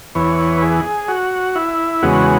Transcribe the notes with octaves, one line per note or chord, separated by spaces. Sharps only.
E2 E3 B3 C#5
B4
G#4
F#4
E4
E2 C#3 G#3 B3 F#4